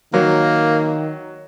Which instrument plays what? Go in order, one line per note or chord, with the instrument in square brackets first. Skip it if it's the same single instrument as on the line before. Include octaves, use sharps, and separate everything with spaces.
[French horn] D#3 [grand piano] F#3 [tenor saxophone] A#3